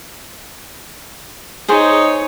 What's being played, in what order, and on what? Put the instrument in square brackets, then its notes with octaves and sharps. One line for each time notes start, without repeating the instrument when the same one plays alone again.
[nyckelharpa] D#4 C#5 [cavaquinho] G#4 C5